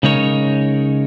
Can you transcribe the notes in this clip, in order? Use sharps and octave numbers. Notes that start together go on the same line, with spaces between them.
C#3 G#3 D#4 A#4 C#5